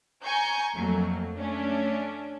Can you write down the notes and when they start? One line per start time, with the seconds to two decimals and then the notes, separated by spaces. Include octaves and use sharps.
0.25 G#5 A#5 C#6 G6
0.75 F2 F#3 A3 A#3
1.38 A3 C#4 D4